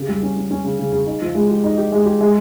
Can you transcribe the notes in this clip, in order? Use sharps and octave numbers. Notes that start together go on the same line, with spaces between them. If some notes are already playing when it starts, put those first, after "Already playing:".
Already playing: C#3 G4
G3
C#4
C#4
C#4
C#3
C#3
C#3
D#4
F3
G#3
G4
D#4
G4
G#3
G4
G#3